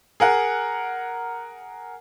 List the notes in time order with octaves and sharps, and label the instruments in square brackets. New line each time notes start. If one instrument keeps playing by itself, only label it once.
[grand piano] G#4 A#4 F#5